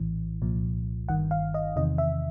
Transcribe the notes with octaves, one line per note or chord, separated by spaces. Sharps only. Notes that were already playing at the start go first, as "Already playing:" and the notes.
Already playing: A#1 A2 E3
C2 A#2 F3
G1 G2 D#3 F#5
F5
D#5
E2 C3 D#3 D#5
E5